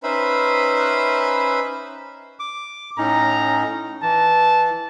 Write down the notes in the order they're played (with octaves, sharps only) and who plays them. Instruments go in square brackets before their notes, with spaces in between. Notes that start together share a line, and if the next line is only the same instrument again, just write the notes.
[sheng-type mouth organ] C#4 D#4 B4 C5 E5 B5
[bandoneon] D6
[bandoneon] A2 C#4 D#4 [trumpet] A#5
[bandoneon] E3 [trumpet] A5